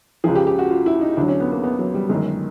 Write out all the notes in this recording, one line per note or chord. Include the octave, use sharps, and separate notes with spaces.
C#2 C#3 F3 G#4
G4
G4
F#4
F4
E4
D#4
D2 D3 F#3 D4
C#4
B3
A#3
B3
F#3
G3
G1 F#2 D#3 G#3